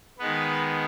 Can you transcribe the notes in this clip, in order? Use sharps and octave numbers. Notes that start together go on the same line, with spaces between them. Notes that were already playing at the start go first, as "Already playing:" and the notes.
D#3 G#3 B3 B4